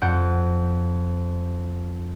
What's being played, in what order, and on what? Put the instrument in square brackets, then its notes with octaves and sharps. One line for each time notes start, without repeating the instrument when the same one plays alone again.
[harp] F2 C5 F#5 G6 D7